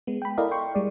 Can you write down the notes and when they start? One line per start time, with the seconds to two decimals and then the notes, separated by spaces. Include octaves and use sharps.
0.07 G#3 B3
0.22 G5 B5
0.38 E4 A4 A#4 D5 D#5 F5
0.51 G5 C6 C#6
0.75 G3 G#3 D5